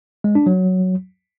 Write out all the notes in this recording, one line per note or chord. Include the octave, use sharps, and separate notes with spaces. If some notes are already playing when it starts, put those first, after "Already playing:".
G#3
D4
F#3